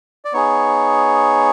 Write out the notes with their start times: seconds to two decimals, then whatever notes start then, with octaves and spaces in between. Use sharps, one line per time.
0.25 D5
0.33 B3 D#4 G#4 C#5